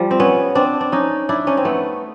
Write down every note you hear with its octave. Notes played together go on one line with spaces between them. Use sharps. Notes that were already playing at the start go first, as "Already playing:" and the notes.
Already playing: F3 G3
C4
B3 C#4
C4 D4
D4
C#4 D#4
D4 E4
C#4 D#4
C4
A3 B3